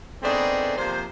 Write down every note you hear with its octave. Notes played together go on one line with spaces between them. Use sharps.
A3 B3 C4 D4 D#4 G#4
C3 F3 A#3 C5